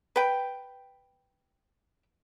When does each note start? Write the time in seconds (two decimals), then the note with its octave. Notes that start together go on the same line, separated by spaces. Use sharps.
0.16 B4 G5